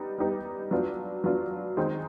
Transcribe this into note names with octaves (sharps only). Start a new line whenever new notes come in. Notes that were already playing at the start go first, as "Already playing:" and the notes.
Already playing: G3 B3 D#4 G4
G3 B3 D#4 G4
F#3 B3 D4 F4
F#3 B3 D4 F4
D#3 G#3 C4 D#4